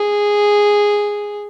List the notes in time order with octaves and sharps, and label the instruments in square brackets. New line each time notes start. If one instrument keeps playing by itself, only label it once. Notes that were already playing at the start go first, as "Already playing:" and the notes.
Already playing: [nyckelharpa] G#4